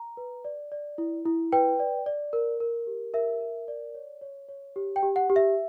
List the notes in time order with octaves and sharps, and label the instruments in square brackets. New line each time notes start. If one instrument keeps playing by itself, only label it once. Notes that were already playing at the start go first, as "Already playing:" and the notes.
Already playing: [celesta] A#5
B4
D5
D5
E4
E4
B4 G5
D5
D5
A#4
A#4
G4
A#4 E5
A#4
D5
C#5
C#5
C#5
G4
G5
G4
F#5
G4
E5